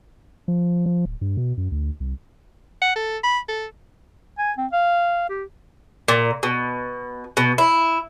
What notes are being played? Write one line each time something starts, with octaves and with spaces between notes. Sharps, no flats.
F3
F3
D1
G2
B2
F#2
D2
C2
F#5
A4
B5
A4
G#5
C4
F5
G4
A#2
B2
B2
E4